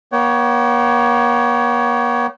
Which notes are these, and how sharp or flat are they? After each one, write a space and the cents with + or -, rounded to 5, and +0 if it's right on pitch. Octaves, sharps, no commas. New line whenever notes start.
A#3 +45 C#5 +15 G5 -40